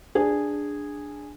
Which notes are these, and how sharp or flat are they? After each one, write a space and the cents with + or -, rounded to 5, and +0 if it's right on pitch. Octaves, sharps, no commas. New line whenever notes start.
D4 +0 G#4 -10